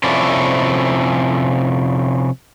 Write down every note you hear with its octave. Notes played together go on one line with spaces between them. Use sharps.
C3 F3 C#4 E4 A4 D5